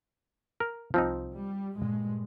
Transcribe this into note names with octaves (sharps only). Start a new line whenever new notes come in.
A#4
C2 F3 C4 D#4
G3
G2 A#2 G#3